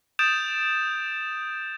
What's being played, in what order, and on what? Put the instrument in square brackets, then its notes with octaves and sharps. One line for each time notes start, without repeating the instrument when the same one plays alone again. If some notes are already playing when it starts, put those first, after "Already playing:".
[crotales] D#6 G6 A6 D7 E7 F7